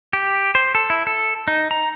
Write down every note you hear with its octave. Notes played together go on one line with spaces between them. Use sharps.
G4
C5
A4
E4
A4
D#4
A#5